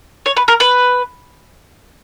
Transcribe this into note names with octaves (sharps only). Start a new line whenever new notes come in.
C#5
B4
A#4
B4